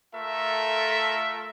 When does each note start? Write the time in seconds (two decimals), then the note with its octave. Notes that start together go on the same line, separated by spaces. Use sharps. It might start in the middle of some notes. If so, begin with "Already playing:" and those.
0.14 A3 F4 A4 A#4 E5